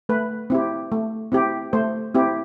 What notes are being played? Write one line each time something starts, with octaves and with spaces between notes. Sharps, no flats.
A3 B4
C4 E4 G4
A3
C4 E4 G4
A3 C5
C4 E4 G4